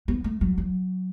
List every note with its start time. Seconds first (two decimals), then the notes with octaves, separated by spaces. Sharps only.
0.08 B3
0.24 A3
0.41 F#3
0.58 F#3